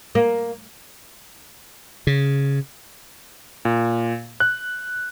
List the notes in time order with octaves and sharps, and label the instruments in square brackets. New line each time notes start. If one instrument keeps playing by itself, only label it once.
[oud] A#3
[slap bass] C#3
[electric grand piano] A#2
F#6